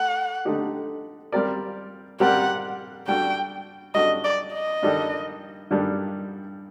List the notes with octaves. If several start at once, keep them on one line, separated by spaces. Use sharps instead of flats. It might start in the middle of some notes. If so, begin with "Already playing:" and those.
Already playing: A3 F#5
D3 A3 D#4 G4
G3 C4 G4 A#4 D5
G3 C4 G4 A#4 D5 F#5
G3 D4 F#4 A4 G5
G3 D4 F#4 A4 D#5
D5
D#5
G2 D#3 G3 D4 A4
G2 D#3 G3 D4 A4